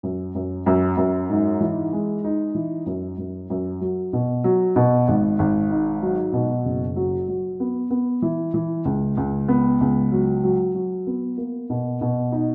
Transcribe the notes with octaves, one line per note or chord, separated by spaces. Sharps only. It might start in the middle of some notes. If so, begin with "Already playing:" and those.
F#2
F#2
F#2
F#2
G#2
E3
G#3
D#4
E3
F#2
F#2
F#2
F#3
B2
F#3
B2
G#1
G#1
G#2
F#3
B2
F#1
F#3
F#3
B3
B3
E3
E3
C#2
C#2
B3
C#2
F#3
F#3
F#3
B3
A#3
B2
B2
D#4